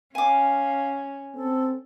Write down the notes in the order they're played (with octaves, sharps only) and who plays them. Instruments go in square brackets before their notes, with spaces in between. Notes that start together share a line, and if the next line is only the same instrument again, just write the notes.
[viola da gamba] C#4 [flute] F5 [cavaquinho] G#5 D6
[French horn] C4 [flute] A4